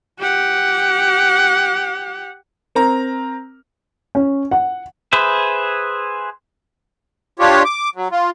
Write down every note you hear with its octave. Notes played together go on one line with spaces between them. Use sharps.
G4 F#5
C4 A#4 A#5
C#4
F#5
G#4 B4 C5 E5
D4 F4 G4 C#5
D6
F#3
F4